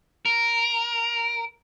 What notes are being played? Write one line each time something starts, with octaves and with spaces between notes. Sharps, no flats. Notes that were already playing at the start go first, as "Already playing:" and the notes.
A#4